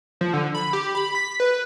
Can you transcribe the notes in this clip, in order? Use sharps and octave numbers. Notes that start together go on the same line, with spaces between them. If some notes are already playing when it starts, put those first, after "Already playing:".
F3
D3
B5
G4
B5
B6
B4